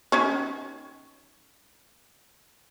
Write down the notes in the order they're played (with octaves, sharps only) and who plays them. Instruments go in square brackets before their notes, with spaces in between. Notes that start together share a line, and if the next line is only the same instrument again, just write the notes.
[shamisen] D#3 C#4 C#5